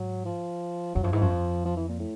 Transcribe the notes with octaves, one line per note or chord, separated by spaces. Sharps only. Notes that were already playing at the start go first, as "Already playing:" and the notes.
Already playing: G#2 F#3
F3
F2 F#3
F#2 F3
G#2 E3
F#2 F3
F2
F3
E3
A#2
A2